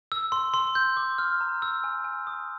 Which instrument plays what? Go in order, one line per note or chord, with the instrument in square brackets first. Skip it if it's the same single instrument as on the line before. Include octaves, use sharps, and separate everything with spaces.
[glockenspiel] E6
C6
C6
G6
D6
F6
A#5
E6
G#5
G#5
D#6